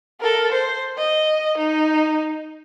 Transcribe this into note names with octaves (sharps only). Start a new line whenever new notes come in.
A4 A#4
C5
D#5
D#4